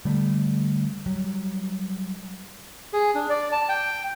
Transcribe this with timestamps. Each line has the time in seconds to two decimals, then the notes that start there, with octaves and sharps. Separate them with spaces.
0.05 D3 G3 A3
1.06 F#3 G3
2.93 G#4
3.15 D4
3.30 D5
3.52 A5
3.69 G5